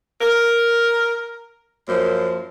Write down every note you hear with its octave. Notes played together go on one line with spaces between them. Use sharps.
A#4
F#2 F3 A#3 C5